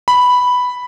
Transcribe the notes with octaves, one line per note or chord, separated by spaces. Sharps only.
B5